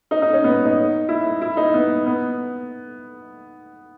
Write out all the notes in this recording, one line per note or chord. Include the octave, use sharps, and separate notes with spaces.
D#4
D#4
C#4
B3
D#4
E4
E4
D#4
B3
B3